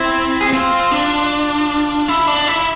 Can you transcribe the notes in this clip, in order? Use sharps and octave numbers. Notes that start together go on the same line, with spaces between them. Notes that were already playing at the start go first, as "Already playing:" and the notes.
Already playing: C4 E4
G#4
C4 F4
D4
E4
D4
E4